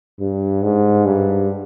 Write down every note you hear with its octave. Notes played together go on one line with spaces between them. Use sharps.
G2
G#2
G2